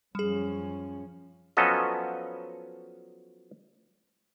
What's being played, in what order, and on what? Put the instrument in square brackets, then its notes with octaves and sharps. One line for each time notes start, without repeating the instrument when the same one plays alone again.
[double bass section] F#2 F3 C#4 [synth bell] G3 G#4
[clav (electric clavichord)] F3 F#3 B3 C#4 A4 D#5